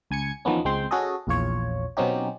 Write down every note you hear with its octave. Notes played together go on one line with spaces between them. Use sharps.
C#2 G#5 G#6 C#7
E2 D#3 F3 A#3 B3 C#4
C#2 G#3 C4 G5 C6
C#4 F#4 G#4 A4 D#5
A#1 E2 F4 C#5
B2 F#3 C4 C#4 D#4 G4